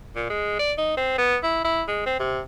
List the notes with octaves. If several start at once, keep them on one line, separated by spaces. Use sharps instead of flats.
A#2
G#3
D5
D#4
C4
B3
E4
E4
G#3
C4
C3